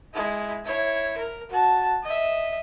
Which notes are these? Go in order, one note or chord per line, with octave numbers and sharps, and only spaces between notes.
G#3 E4
E4 C#5
A#4
F#4 A5
D#5 E5